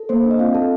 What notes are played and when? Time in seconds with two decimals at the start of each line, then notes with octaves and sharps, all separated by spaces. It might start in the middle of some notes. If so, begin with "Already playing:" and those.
Already playing: A4
0.09 A#3 C5
0.25 D4
0.31 D#5
0.39 C4 F4 F5
0.54 A4 A5